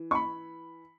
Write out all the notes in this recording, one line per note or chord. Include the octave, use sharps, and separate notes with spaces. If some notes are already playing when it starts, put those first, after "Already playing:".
Already playing: E3
C#6
B5